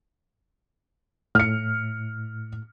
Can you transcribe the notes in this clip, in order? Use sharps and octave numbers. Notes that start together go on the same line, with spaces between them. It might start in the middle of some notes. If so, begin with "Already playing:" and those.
A2 F6 C#7